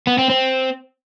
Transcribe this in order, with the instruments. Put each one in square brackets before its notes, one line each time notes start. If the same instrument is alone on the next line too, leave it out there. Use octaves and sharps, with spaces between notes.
[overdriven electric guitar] B3
C4
C4